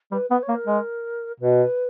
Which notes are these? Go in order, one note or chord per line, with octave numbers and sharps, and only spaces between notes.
G3 B4
B3 B4
C#5
A#3
A#4
G#3
B2 B4